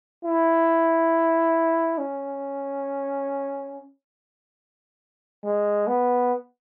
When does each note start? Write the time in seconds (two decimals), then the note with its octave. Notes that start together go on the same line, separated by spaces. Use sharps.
0.24 E4
1.98 C#4
5.44 G#3
5.88 B3